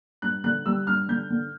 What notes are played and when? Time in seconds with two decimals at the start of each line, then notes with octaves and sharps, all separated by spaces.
0.22 G2 F#6
0.44 D3 F#6
0.66 G3 E6
0.87 G2 F6
1.09 D3 G6
1.30 D3